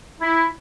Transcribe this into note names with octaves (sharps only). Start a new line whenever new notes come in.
E4